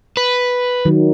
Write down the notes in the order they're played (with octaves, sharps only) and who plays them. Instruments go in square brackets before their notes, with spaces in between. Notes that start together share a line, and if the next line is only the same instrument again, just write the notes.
[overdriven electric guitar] B4
[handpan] D#3 F#3